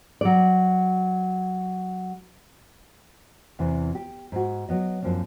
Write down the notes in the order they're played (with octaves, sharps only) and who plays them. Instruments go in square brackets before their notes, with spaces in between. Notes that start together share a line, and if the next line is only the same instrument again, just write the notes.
[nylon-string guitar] F#3 D5
E2 C3 E3
G4
G#2 F#4
F#3 B3 D#5
F#2 F3 A#3 C4 D4